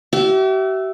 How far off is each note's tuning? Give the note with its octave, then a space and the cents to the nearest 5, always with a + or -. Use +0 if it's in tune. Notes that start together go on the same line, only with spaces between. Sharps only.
G4 -45 E5 +0